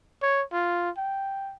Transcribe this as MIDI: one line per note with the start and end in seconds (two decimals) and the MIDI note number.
0.22 0.43 73
0.53 0.90 65
0.97 1.55 79